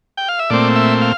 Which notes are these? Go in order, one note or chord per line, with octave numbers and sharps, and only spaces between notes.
G5
F5
E5
A#2 A3 C4 D5
E5
F5